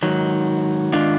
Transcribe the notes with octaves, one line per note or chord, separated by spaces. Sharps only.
G#2 D#3 F#3
G#2 D#3 D4 F4